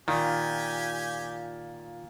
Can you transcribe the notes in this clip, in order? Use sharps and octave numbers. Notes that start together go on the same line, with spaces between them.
A#2 D#3 F4 G4 G#5